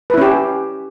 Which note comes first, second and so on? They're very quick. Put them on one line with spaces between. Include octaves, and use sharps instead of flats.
B4 E4 C#4 G4